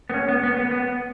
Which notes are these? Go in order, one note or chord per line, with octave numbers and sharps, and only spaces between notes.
B3
C#4
B3
B3
B3
B3